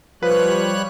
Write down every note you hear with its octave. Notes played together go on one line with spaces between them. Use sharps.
F3 G3 B4 C#5 F#6